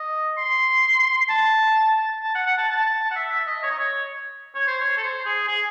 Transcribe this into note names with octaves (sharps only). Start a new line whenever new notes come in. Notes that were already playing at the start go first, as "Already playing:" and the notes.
Already playing: D#5
C6
A5
A5
F#5
F#5
A5
A5
F#5
E5
E5
D#5
C#5
D#5
C#5
C#5
C5
C#5
A4
C5
G#4
G#4